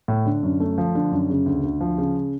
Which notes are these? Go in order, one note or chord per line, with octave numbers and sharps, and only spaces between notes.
A2
D3
F#2
A3
F3
D3
F#2
C#3
D2
D2
F3
C#3